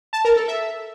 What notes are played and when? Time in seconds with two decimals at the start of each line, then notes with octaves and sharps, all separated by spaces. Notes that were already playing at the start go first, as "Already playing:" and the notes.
0.13 A5
0.25 A#4
0.36 A4
0.48 E5